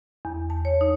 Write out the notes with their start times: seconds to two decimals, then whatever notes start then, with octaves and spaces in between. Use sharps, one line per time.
0.25 E2
0.50 A5
0.65 C#5
0.81 D#4